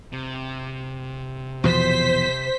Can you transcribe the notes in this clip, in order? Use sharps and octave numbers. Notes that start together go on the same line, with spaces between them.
C3
E2 B2 F3 C5 B6